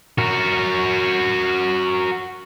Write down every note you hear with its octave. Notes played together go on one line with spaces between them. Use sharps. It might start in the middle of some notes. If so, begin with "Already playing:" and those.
F#4 A#4